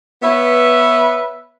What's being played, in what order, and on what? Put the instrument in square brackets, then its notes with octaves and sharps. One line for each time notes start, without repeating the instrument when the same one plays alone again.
[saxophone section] B3 B4 C#5 E5